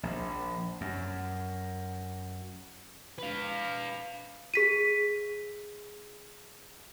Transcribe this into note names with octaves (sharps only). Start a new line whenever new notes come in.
A#1
F#2
B4 F5
G#4 B6 D#7